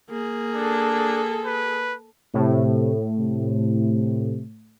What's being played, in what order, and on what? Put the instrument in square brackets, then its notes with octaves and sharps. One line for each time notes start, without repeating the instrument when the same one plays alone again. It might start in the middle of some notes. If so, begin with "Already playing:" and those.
[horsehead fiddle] A#3 G#4
[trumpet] D4 [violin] A4
[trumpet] B4
[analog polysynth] A2 [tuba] C3
[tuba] C3